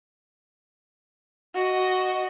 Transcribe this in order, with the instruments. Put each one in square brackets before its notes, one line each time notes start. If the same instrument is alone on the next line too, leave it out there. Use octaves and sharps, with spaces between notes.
[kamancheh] F#4 D#5